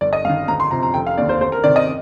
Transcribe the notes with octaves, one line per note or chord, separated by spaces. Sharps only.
G1 D5
D#5
G2 D#3 F5
D2 A#5
C6
C3 F3 A#5
A#5
F1 G5
F5
D#2 D#3 D5
C5
D2 C5
A#4
C3 D#3 D5
D#5